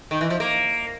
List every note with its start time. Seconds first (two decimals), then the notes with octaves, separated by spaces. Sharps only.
0.11 D#3
0.21 E3
0.30 F3
0.40 A#3